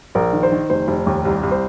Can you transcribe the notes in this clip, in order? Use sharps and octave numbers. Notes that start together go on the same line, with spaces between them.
A#1 A#4
D#3
C5
D#3
F1 C5
F1
D#2
C2
C2
C5